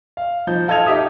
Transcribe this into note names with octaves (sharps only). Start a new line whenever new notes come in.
F5
F3 D#4 G6
F4 A4 D#5 G#6 F7
D#4 G4 E5 D#6